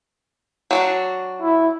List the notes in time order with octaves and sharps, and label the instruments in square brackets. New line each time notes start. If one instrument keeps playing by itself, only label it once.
[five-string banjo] F#3 D4 F#4
[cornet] E4